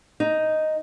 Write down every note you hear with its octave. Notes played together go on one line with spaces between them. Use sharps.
D#4